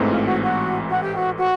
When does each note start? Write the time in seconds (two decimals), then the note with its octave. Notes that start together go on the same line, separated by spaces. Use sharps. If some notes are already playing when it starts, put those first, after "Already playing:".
Already playing: A1 G#2 E3 A3 C4
0.10 F4
0.21 G4
0.26 F#4
0.42 F#4
0.89 F#4
1.02 G4
1.16 F#4
1.37 F#4